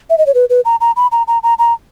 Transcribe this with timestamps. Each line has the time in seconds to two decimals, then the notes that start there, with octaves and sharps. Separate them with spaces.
0.10 E5
0.18 D#5
0.26 C#5
0.34 B4
0.50 B4
0.65 A#5
0.81 A#5
0.96 B5
1.12 A#5
1.28 A#5
1.43 A#5
1.59 A#5